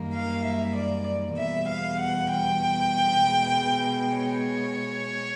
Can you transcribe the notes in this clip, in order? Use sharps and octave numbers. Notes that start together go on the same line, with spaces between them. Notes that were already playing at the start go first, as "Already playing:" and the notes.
Already playing: F#2 D#3 G3 A#3
F5
E5
D5
E2 B2 G3 E5
F5
F#5
G5
B2 G#3
C#5